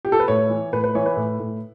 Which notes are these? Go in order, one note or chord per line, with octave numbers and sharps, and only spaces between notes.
G4
A4
B4
A2 C#5
E3
A2 B4
B4
E3 C#5
B4
A2
A2